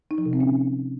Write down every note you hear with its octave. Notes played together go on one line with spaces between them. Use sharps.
D#4
F3
C3
C4
C#4